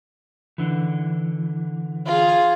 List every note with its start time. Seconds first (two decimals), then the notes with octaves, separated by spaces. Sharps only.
0.58 D3 E3
2.06 F4 G#4